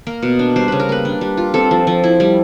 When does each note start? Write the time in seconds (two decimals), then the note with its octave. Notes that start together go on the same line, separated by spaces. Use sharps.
0.07 A#3 A#4
0.22 B2
0.39 D4
0.56 G3 C5
0.68 C#3 B4
0.80 A#4
0.89 A#3 B4
1.05 D4
1.21 G3
1.37 F4
1.54 C4 A4
1.71 F3
1.87 F3
2.04 E4
2.20 G3